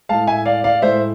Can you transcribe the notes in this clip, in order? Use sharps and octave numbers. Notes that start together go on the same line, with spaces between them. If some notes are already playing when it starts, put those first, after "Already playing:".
A2 G#3 F5 A5
E5 G#5
D5 F5
D5 F5
A2 G#3 C5 E5